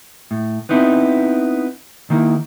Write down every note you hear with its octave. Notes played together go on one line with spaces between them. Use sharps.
A2
B3 C4 D#4 E4
D#3 A#3 E4